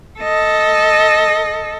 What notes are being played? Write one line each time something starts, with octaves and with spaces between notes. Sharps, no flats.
A4 D#5